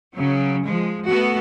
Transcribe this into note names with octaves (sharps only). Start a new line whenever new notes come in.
C#3 F#3
F3 G#3
A3 B3 F#4 A4